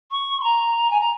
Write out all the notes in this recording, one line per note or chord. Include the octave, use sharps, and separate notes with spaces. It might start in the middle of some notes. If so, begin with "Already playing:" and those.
C#6
C6
A#5
G#5
A#5